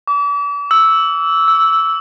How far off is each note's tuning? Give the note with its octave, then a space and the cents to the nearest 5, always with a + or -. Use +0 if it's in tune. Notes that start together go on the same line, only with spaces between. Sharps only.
D6 -40
E6 -5
E6 +5